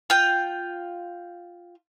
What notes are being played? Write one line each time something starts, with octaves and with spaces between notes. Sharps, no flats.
F4 G5